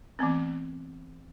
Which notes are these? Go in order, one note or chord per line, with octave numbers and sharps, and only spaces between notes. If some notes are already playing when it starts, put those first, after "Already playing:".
E3 A3 B3 C4